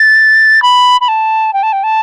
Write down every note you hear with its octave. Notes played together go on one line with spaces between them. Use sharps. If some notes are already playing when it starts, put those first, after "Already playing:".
Already playing: A6
B5
B5
A5
G5
A5
G5
A5